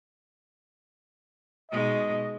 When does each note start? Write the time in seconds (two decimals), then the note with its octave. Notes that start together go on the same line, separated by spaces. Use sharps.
1.71 B2 G#3 D#4 D#5